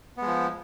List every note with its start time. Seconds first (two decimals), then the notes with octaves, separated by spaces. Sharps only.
0.17 B3
0.22 G#3
0.27 F3